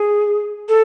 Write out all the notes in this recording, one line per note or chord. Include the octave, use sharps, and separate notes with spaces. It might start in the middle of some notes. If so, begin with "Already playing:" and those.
Already playing: G#4
A4